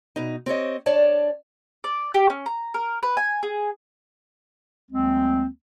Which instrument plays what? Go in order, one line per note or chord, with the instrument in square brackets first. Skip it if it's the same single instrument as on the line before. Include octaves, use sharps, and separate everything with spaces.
[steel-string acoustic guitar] B2 D#4
C4 G4 C#5 D#5
D4 C#5 D5 A5
[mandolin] D5
G4
C#4
A#5
A#4
B4
G#5
G#4
[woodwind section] D2 F#3 G#3 A#3 C4